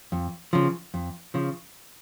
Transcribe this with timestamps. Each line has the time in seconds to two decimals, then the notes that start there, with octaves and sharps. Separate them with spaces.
0.12 F2
0.53 C#3 F3
0.94 F2
1.34 C#3 F3